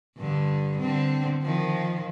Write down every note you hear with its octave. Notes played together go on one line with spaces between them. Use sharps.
G2 D3
D3 C4
D#3 F3